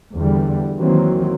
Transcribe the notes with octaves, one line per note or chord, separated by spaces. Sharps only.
E2 D3 G3
D#3 E3 F#3 A#3 C4